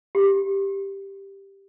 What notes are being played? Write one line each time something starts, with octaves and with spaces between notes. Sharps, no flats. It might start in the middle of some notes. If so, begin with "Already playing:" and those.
G4